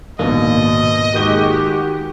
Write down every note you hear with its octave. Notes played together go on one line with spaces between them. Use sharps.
A#1 D#2 G#2 B2 A#3 D#5
D#3 G#3 F#4 G4 G6 G7